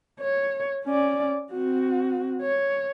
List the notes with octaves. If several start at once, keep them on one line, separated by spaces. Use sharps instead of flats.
C#5
C#4 D5
C4 F#4
C#5